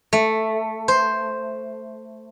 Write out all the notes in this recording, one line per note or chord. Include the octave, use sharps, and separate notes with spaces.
A3
C5